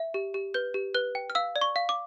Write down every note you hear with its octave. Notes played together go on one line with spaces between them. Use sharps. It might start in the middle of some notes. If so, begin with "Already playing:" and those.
Already playing: E5
G4
G4
B4 G6
G4
B4 F#6
G5
F6
F5 E6
D5
C#6
F5
D6